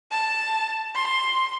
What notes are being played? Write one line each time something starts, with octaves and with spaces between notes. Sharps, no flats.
A5
C6